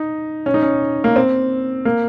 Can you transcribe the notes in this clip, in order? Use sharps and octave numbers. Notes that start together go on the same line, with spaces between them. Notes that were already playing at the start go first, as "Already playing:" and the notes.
Already playing: D#4
C#4
D#4
C#4
A#3
C4
A#3